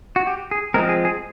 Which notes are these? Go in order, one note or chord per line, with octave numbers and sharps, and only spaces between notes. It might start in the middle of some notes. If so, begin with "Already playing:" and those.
F#4
G4
G#4
F3 G#3 C4 A#4
G#4
G#4